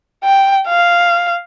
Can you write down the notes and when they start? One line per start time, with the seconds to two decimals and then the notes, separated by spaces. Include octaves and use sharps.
0.24 G5
0.68 F5